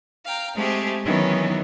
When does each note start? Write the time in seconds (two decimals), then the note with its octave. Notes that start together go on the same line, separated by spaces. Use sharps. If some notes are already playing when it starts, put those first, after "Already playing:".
0.25 F5 G5 A#5
0.55 G#3 A3 C4 G4 G#4
1.05 D#3 E3 F#3 B3 C#4 D#4